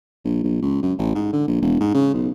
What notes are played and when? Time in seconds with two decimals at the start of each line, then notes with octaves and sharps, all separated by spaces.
0.24 A#1
0.44 A#1
0.62 C#2
0.82 F#2
0.98 A1
1.15 G#2
1.32 D3
1.47 A#1
1.62 E1
1.80 G#2
1.94 C#3
2.14 B1